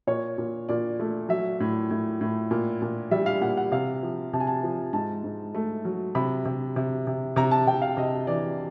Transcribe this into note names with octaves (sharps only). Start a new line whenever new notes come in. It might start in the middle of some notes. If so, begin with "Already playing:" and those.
A#2 C#5
A#2
A#2 D5
A3
F#3 E5
A2
A2
A2
A#2
A#2
G3 E5
F5
A#2 F#5
F#5
C3 F5
F3
C3 A5
G#5
A5
F3
G#2 A5
G#2
A3
F#3
C3 B5
C3
C3
C3
C3 A#5
A5
C3 G5
F5
C3 D#5
E3 D5